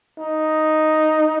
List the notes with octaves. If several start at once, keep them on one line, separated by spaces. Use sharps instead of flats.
D#4